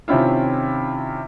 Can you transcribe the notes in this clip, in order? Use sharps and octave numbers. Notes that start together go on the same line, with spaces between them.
C3 D#3 C4 C#4 E4 F4